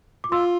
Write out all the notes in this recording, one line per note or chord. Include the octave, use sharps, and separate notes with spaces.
D6
F4 C6 E6